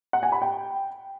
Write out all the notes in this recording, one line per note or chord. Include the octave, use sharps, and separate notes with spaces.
F#5
G#5
B5
G5